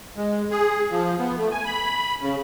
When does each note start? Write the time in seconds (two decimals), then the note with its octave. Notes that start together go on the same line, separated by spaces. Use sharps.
0.16 G#3
0.51 G#4
0.91 F3
1.19 B3
1.37 A3
1.51 G#5
1.65 B5
2.21 C#3